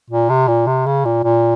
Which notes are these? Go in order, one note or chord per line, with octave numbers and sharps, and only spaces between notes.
A#2
C3
A#2
C3
C#3
A#2
A#2